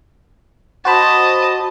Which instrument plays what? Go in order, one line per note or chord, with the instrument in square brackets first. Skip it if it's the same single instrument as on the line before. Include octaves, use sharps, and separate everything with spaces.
[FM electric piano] F#4 C5 B5 [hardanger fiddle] D#5 A5